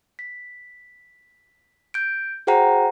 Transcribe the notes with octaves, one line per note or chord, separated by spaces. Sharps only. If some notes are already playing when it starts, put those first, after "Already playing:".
B6
G6 D7
F#4 G#4 C5 F#5 G5 A#5